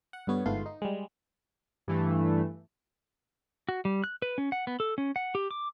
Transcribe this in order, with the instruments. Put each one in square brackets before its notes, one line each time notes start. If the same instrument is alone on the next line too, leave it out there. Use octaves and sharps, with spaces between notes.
[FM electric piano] F#5
G2 D3 B3 C#5
G1 G#2 A3 B3 F4 C6
D#4
G3 G#3
[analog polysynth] G2 E3 A3
[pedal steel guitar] F#4
G3
F#6
B4
C#4
F#5
B3
A4
C#4
F#5
G4
D6